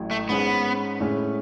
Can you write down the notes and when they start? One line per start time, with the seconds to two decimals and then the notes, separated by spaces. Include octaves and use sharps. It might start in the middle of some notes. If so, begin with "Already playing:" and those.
Already playing: A1 A2 F#3
0.11 A3
0.29 G#2 G#3 B3 C#4
1.00 A2 G#3 C#4